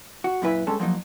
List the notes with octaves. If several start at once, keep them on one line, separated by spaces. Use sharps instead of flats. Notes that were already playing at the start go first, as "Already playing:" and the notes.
F#4
F#2 A#2 E4 B4 E5
G2 G#3 C#4 A4 A5
F3 F#3 A#3 D#4